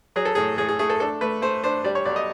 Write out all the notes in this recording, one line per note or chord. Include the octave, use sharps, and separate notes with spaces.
F#3 G#4
A4
A2 G#4
A2 G#4
G#4
A3 G#4
A4
D4 A4
A3 B4
A3 C5
D4 C5
G3 D5
C#5
B1 D5
D#5